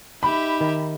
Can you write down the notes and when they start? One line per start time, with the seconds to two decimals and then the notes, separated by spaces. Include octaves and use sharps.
0.23 D#4 G4 E5 B5
0.61 D#3 A#5